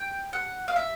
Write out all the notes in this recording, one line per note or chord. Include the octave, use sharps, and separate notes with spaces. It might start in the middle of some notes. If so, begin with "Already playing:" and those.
Already playing: G5
F#5
F5
E5